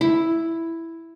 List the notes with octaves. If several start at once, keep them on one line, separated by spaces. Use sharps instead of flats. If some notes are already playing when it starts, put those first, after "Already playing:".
E4